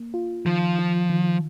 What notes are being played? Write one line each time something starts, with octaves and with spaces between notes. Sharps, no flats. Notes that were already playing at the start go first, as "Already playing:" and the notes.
Already playing: A#3
F4
D#3 F3
F4
D#3